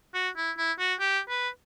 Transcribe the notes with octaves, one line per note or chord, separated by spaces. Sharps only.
F#4
E4
E4
F#4
G4
B4